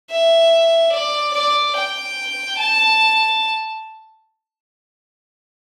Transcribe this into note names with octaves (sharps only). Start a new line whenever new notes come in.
E5
D5
D5
G5
A5